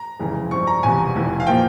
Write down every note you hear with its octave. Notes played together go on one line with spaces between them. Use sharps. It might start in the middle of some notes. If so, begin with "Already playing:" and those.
Already playing: A#5
F1 F2 C#3 E3 G#3
G2 F3 C4 C#6
A#5
E1 E2 C3 G#5
F1 F2 E3
F5
A#2 F3 A#3 G5